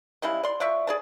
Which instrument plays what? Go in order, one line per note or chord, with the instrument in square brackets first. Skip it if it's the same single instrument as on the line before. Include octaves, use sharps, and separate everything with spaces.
[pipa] C#3 G3 G#3 E4
D5 C6
F3 D5 E5 C#6
G#4 D5 A5